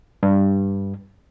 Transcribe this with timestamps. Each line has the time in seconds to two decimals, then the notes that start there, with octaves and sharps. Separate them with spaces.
0.23 G2